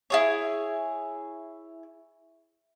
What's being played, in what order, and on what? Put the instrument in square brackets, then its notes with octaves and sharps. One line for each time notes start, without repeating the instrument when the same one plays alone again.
[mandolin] E4 G#4 C#5